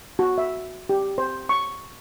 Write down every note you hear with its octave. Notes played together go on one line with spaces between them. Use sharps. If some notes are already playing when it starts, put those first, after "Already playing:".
F#4
E5
G4
C5
C#6